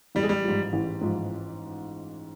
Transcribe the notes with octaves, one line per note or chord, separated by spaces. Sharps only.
A1 G3
G#3
G3
G#2 F3
A1
G#2 F3